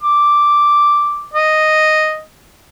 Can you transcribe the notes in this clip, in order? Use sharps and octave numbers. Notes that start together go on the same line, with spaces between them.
D6
D#5